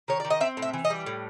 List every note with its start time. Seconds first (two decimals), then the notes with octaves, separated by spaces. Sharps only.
0.08 D#3 C#5
0.20 D#3 D5
0.30 D#5
0.40 C4 E5
0.57 A2
0.62 E5
0.73 E3
0.85 D#5
0.90 G3
1.06 A2